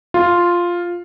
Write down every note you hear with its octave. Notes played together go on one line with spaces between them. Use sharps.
F4